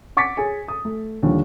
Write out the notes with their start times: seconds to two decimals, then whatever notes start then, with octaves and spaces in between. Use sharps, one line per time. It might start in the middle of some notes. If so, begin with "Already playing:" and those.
0.17 F#5 C#6 D6 A6 B6 C#7
0.37 G#4 C#5 G#5
0.68 D#6
0.85 A3
1.23 D#2 D3 F3 G3